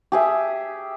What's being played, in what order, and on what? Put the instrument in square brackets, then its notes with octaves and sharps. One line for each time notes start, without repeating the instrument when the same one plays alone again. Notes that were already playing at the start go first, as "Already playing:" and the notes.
[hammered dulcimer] G4 G#4 E5